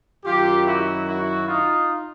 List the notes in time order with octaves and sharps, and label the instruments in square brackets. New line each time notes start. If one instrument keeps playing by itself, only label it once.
[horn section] F#2 D#3 F#3 F4 G4
E4 F#4
E4 F#4
D#4 F4